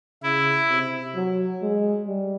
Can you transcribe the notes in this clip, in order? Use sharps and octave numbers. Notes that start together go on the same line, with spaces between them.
C#3 E4
C3
F#3
G#3
G3